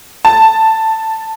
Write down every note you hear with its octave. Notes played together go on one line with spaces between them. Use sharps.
A5